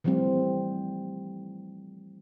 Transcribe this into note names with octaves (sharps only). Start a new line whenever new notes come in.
E3 F3 G3 A3 C4